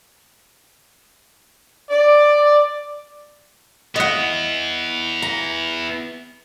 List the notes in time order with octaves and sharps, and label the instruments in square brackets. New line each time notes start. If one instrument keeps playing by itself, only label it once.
[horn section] D5
[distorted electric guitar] B3 E4 [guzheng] D#5 F#5
[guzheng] A#5